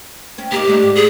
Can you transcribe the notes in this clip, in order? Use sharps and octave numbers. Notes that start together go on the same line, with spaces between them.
C4 C#4
A#3 D#4 G4
G#3 A3 D4
G#2
G#4